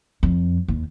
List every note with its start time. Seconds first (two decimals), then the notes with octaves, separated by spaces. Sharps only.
0.23 F2
0.68 D#2